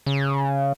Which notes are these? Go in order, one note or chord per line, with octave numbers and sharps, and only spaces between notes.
C#3